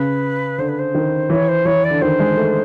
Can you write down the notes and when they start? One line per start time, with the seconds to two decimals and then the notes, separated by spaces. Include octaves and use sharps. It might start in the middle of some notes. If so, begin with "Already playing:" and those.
Already playing: C#3 B4
0.58 D3 C5
0.68 B4
0.78 C5
0.95 D#3
1.30 E3 C#5
1.48 C5
1.65 E3 C#5
1.84 D5
1.91 D3
2.01 D#3 C5
2.20 G#3
2.37 A3